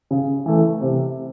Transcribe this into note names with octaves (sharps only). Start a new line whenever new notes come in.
C#3
E3 A3
C3